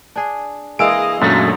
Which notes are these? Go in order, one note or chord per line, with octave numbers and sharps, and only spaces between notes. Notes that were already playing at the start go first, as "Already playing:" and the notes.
D4 G#4
E3 G#3 A#3 G#4 D#5 F5 E6 D7
F#2 A#2 D3 F#3 G#3 A3 D#4 F4